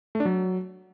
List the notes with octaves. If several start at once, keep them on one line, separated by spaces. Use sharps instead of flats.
A3
D4
F#3